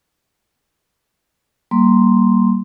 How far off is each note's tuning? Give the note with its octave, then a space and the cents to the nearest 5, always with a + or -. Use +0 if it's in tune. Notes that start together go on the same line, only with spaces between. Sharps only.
G3 -20 A#3 +0 C6 +0